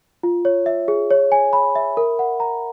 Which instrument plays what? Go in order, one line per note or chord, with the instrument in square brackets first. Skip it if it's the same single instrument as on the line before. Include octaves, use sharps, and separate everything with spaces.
[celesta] F4
C#5
E5
G#4
C#5
G#5
B5
E5
A#4
F#5
A#5